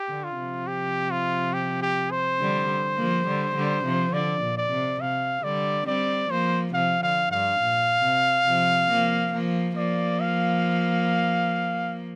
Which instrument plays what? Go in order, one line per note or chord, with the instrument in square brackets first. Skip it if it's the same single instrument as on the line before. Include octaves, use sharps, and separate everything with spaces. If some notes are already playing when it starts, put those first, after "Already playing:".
Already playing: [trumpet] G4
[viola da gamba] D3
[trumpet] F4
[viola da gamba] C3 F3
[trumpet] G4
F4
G4
G4
C5
[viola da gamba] D3 G3
F3 A#3
D3 G3
D3 G3
C3 F3
[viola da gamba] D3 [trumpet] D5
[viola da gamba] A#2
[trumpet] D5
[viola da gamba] C3
[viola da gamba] C3 [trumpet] F5
[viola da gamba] D3 G3 [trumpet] D5
[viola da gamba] G3 C4 [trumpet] D5
[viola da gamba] F3 A#3 [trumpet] C5
[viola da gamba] C3 F3 [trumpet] F5
[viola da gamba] D3 [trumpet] F5
[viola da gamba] G2 [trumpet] F5
[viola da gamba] A#2
C3
C3 F3
F3 A#3
F3 A#3
[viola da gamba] F3 A#3 [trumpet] D5
[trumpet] F5